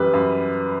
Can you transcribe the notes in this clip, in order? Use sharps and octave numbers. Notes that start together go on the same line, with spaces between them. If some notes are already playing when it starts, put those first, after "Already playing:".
Already playing: F#2 E3 G3 B4
F#2